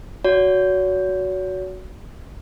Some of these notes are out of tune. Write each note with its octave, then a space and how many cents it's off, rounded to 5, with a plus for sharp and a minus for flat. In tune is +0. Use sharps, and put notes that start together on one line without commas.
F#4 +0 C#5 +40